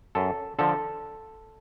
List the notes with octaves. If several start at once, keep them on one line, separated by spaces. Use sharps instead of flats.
F#2 A4
D3 F3 A4